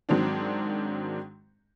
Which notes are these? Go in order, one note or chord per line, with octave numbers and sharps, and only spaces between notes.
G#2 D#3 F#3 C4 D4